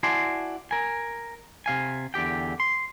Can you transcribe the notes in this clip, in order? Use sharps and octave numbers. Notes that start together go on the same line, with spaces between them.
E4 F#4 D5 G#5 A5 C6
A#4 G#5
C3 F5 G#5
E2 D3 G4 G5
C6